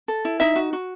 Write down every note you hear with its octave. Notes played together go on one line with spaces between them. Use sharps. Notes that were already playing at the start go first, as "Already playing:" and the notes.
A4
E4
D#4 E5
F#4
F#4